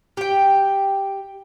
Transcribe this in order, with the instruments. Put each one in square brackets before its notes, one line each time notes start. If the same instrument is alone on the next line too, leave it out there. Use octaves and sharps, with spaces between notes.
[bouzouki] G4 G5